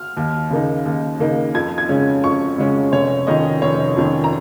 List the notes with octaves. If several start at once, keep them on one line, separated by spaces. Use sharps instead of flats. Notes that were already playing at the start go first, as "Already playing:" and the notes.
Already playing: F6
D#2
C#3 A#3 D#4
D#2
C#3 A#3 D#4
F2 G#6
G#6
C#3 G#3 C#4
F2 C#6
C#3 G#3 C#4
F1 C#5
F2 D#3 C#4 D#5
F1 C#5
F2 D#3 C#4
A#5